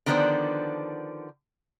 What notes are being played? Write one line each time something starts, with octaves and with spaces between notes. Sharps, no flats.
D3 D#3 F3 B3 D4 C5